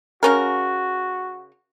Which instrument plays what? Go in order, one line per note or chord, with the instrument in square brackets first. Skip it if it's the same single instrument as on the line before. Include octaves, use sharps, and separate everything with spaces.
[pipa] C#3 C#4 A#4 [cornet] F#4